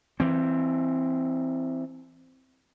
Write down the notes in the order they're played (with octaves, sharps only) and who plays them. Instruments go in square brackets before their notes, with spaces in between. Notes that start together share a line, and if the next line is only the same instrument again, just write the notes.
[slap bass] E3 C4